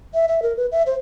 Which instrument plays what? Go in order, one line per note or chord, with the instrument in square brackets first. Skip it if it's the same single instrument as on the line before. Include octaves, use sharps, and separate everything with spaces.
[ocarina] E5
E5
A#4
B4
E5
C5